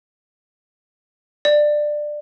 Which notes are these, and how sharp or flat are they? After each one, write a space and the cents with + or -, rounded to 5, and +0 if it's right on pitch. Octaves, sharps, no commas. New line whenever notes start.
D5 +15